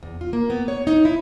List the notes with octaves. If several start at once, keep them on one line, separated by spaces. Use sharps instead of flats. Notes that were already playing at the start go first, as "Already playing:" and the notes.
E2
F4
A#3
B3
C#5
D#4
E4